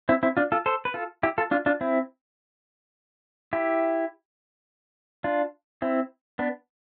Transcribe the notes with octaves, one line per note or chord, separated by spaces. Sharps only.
C4 E4
C4 E4
D4 F4
F4 A4
A4 C5
B4
F4 A4
E4 G4
F4 A4
D4 F4
D4 F4
C4 E4
E4 G4
D4 F4
C4 E4
B3 D4